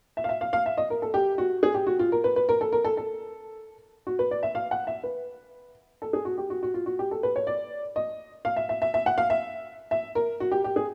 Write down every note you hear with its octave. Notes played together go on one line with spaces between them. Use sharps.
E5
F5
E5
F5
F5
E5
D#5
A#4
A4
G4
F#4
G#4
G4
F#4
F4
A#4
B4
B4
A#4
A4
A#4
A4
A4
F#4
B4
D5
E5
F5
F#5
E5
B4
A4
G#4
F#4
G4
F#4
F#4
F4
F#4
G4
A4
B4
C#5
D5
D#5
F5
E5
E5
E5
E5
F#5
F5
E5
E5
A#4
F#4
G4
G4
G#4